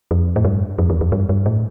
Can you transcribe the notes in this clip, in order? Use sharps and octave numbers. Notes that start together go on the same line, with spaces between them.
F2
A2
G2
F2
E2
F2
G2
G2
A2